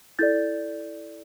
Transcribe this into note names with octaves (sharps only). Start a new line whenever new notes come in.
E4 A4 D5 G6 A6